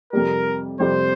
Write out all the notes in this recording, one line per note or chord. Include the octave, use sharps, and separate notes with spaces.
F2 C3 G3 A#4
F2 C3 G3 C5